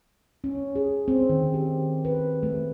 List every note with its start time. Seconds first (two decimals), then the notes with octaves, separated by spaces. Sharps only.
0.44 C#4
0.76 G#4
1.08 C4
1.29 D#3
1.54 G4
2.05 B4
2.43 A3